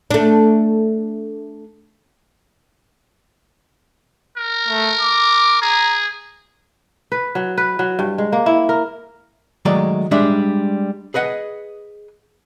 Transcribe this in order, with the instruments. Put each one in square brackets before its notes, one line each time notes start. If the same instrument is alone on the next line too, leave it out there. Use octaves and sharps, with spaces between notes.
[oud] A3 D4
[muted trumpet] A#4
[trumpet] A3
D6
[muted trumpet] G#4 [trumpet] A#5
[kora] B4
F#3
B4
F#3
G2
G#3
A#3
E4
A#4
[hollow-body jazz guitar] D#3 F#3 G#3 A3 D5
G3 G#3 D4 E5
G#4 B4 D#5 F#5